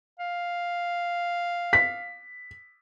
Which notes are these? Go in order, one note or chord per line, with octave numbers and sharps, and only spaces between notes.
F5
B6